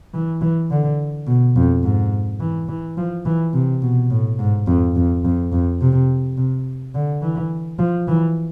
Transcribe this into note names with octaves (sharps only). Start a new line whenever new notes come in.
E3
E3
D3
B2
F2
G#2
E3
E3
F3
E3
C3
B2
A2
G#2
F2
F2
F2
F2
C3
C3
D3
E3
F3
E3